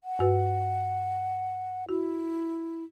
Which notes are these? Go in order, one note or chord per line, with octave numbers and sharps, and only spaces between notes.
F#5
G2 F#4 B4
E4 F#4